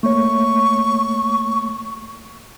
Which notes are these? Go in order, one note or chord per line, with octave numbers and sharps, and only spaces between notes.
A3 A#3 C#5 C#6